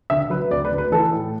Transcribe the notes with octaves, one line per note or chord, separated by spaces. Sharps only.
D3 E5
F#3 B4
D2 D5
B4
D2
B4
E3 A4
A2